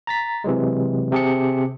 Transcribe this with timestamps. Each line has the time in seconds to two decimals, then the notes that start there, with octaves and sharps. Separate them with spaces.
0.07 A#5 A6 B6
0.44 C3 E3 F#3 G#3
1.12 C3 G4 G#4 A5 C#7